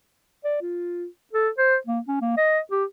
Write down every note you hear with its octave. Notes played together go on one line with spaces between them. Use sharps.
D5
F4
A4
C5
A#3
C#4
A#3
D#5
G4